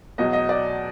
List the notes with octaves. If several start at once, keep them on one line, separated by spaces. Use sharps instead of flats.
E2 B2 F#3 D#5
D#5
D5